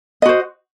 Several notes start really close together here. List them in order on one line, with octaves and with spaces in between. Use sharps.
D#5 F#4 C5